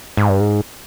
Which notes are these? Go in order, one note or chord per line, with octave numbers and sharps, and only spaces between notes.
G#2
G2
G#2